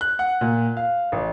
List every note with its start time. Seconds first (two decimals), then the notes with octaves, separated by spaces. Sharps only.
0.01 F#6
0.19 F#5
0.41 A#2
0.77 F5
1.12 A1